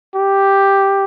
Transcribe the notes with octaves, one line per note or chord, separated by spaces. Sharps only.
G4